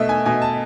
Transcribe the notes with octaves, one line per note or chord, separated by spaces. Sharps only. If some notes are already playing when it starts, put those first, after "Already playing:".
Already playing: B2 A3 D#5 E5
G#5
B2 G#5
A5